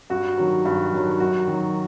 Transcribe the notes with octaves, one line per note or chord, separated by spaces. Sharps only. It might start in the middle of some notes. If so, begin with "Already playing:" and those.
G2 F#4
D#3 F#3
G2
D#3 F#3
F#2 F#4
D#3 F#3